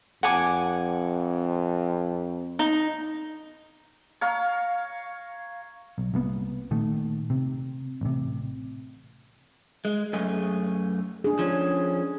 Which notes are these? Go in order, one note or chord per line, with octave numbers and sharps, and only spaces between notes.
F2 F#5 G#5 D6
D#4
C#5 F5 A#5
B1
C2 A#3 B3
A#2 D#3 A3
C3
A1 C3
G#3
F#2 A3 G#4
D4 G#4
F3 C#4